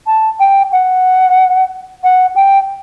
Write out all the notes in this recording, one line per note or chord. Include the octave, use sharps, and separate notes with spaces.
A5
G5
F#5
F#5
G5